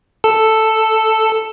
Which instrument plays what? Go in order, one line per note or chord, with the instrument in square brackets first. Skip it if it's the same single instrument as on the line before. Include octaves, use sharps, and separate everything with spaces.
[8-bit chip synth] A4